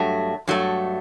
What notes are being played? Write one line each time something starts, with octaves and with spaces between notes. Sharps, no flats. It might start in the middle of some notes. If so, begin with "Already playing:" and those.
Already playing: G2 F#3 A3
G2 F#3 A3